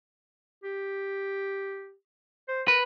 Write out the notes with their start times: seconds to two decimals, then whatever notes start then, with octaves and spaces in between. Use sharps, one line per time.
0.64 G4
2.48 C5
2.68 A#4 B4